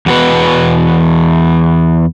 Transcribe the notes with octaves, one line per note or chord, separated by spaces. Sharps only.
E2 F#4 B4